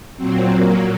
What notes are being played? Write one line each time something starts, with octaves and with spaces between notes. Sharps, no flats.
A#2 F#3 C4
A#3